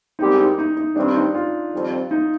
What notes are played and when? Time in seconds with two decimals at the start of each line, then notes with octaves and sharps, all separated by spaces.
0.19 G#2 G3 C4 D#4 G4 A#4
0.39 D#4
0.58 D#4
0.77 D#4
0.96 G2 D#3 G3 C4 D4
1.15 D#4
1.35 F4
1.73 F2 D#3 G3 C4
2.11 D#4